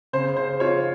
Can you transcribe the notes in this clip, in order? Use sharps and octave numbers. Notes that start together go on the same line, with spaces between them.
C#3 C5
C5
F4 C#5